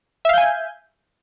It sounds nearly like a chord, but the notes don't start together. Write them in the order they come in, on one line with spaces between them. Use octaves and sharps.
E5 F5 G6 G#5